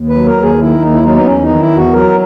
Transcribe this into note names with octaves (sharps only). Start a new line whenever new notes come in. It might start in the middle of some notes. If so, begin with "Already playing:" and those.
Already playing: D#2
B4
F#3
A#4
D#2
G#4
D#3 E4
D#2 D#4
E4
F#3 D#4
B3
E2 C#4
D#4
D#3
E4
E2
F#4
F#3 A#4